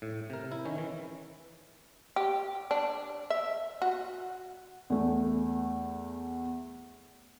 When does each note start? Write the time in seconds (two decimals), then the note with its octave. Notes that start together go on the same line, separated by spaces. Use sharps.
0.02 A2
0.30 C3 A#4
0.52 E4
0.65 D#3 C#4
0.78 E3
2.16 G4
2.71 D4
3.30 E5
3.82 F#4
4.90 E2 A3